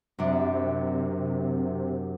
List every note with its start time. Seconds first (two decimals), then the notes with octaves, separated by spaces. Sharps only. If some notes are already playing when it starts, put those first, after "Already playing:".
0.19 F#2 C3 D4